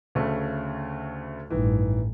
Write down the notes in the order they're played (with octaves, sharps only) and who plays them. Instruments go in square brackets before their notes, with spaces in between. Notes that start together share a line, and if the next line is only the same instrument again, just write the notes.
[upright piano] D2 C#3 A3
[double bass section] A1 G2 [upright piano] D#3 E3